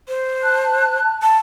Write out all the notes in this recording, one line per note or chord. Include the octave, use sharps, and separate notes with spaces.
C5
A5 F#6
A5